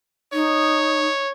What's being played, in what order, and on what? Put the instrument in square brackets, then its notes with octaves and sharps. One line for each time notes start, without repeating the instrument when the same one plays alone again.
[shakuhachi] D#4 [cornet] C#5